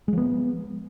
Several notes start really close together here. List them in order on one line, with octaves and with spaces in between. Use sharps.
G#3 F3 B3